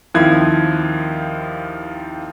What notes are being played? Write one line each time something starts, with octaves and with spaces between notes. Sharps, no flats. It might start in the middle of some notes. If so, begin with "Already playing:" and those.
D#2 F3 C4 E4 F#6 G#6